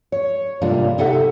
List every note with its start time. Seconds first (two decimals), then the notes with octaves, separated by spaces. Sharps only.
0.12 C#5
0.61 G#2 C3 G3 A#3 D4 F4
0.98 C3 D#4 G4 A4 E5 F#5